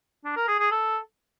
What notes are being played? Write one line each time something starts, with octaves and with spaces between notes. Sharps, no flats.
D4
A#4
G#4
G#4
A4